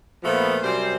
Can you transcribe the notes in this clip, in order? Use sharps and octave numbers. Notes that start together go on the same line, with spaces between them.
A#2 F3 A3 B3
F#2 C3 G3 C4 C5